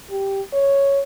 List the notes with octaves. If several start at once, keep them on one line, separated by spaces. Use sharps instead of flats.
G4
C#5